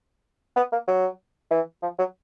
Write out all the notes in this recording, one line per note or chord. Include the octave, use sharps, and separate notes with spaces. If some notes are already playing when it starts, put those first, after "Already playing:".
B3
A#3
F#3
E3
F3
F#3